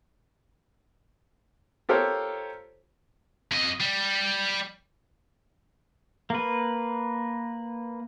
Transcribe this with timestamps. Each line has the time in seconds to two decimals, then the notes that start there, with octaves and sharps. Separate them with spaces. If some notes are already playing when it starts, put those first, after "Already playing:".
1.89 F4 G4 A4 A#4 C5 C#5
3.52 F2 D#5
3.80 G3
6.30 A#3 B4